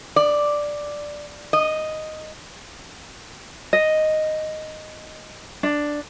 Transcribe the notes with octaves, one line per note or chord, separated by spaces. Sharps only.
D5
D#5
D#5
D4